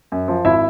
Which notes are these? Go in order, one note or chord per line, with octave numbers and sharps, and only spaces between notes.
F#2
F3
G#1 E4 E5